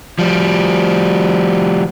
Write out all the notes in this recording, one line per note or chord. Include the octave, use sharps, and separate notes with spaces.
F3 G3